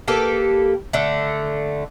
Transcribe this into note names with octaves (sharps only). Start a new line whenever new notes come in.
A#3 G4 A4 B4
D3 A3